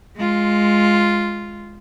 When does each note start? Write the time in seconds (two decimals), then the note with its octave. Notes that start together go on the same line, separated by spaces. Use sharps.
0.16 G#3 F4